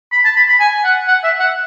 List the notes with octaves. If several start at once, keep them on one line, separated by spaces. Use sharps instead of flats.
B5
A5
B5
B5
G#5
F#5
F#5
E5
F#5